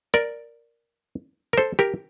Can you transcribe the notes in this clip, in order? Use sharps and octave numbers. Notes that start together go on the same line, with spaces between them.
A#4 D5
A#4
A4 C5
G4 A#4